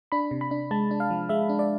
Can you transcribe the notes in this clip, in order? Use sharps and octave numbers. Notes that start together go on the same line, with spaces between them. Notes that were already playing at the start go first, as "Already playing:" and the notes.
D4 B5
C3
B5
D4
G#3 A5
D4
F5
F3
G#3 E5
D4
D5